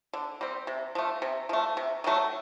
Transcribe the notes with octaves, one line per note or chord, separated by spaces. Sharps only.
D3
G3 C4
C3
F3 A3
C3
F3 A3
C3
D#3 F#3 A3